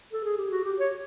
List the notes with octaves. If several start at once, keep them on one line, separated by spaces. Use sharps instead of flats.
A4
G#4
G4
F#4
G4
C#5